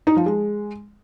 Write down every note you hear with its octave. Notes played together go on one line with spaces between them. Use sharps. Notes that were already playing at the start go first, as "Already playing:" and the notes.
D#4
F3
G#3